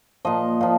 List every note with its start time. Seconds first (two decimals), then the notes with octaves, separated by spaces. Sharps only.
0.25 A#2 F3 D#5
0.61 A#2 F3